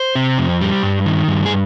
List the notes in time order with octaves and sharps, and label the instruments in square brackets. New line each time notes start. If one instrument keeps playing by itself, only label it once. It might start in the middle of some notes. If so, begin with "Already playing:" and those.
Already playing: [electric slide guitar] C5
C3
F2
G3
G2
D#3
G2
G#4